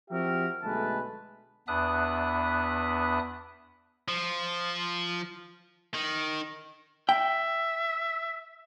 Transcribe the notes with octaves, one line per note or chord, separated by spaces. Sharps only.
F3 C4 F#4 G4 A#4 E5
B1 D3 G#3 A3 B4 A5
E2 B3 D4 E5 D#6 F#6
F3
D#3
E5 G5